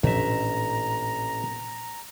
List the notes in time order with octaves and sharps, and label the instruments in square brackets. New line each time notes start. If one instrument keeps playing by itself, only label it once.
[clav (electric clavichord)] A1 E5 [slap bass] A#2 F3 D4 [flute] A#5